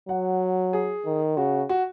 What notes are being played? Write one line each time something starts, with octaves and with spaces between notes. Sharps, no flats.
F#3 F#5
G#4
D#3
C#3 F#4
F#4